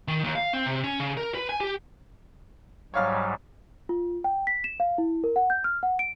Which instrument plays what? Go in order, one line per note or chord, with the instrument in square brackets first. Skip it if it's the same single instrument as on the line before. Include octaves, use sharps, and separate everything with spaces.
[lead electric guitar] D#3
D#2
F5
C4
C3
C#4
C#3
A#4
B4
G#5
G4
[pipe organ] G#2 F#3 G3 [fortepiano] C#5 F5 F6
[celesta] F4
G5
B6
E7
F5
E4
A#4
F#5
G6
F6
F#5
D7